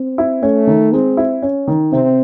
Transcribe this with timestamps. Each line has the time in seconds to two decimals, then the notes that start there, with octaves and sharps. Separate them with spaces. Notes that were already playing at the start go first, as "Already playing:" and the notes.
Already playing: C4
0.18 E4
0.43 A3 C#4
0.67 D#3
0.93 G#3 C4
1.17 E4
1.42 C#4
1.68 D#3
1.92 C3 C4